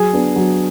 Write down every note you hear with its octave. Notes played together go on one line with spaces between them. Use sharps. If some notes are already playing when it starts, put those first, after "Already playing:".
Already playing: F#3 G#4
B3 D4
F#3